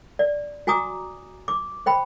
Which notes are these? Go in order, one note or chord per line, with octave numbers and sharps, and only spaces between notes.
D5
F#4 G#5 A#5 D6 D#6
D6
C5 G5 B5